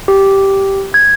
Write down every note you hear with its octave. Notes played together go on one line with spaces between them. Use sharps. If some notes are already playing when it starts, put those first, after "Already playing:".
G4
G#6